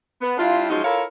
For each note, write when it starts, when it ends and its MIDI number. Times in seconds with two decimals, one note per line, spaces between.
0.22 0.35 59
0.38 0.66 55
0.38 0.66 62
0.38 0.66 64
0.38 0.66 65
0.70 0.81 53
0.70 0.81 54
0.70 0.81 56
0.70 0.81 61
0.70 0.81 63
0.84 1.03 64
0.84 1.03 65
0.84 1.03 69
0.84 1.03 70
0.84 1.03 73
0.84 1.03 77